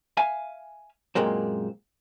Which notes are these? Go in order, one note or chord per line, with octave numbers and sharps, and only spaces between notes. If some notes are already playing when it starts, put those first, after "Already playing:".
E5 F5 G#5
F#2 A#2 G#3 A#3 C4